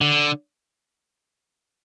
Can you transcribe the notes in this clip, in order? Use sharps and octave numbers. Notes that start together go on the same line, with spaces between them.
D3